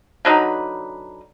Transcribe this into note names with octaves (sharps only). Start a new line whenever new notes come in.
D3 F#3 D#4 B4